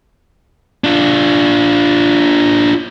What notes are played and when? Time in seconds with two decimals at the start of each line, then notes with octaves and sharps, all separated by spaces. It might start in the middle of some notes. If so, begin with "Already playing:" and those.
0.84 D4 F4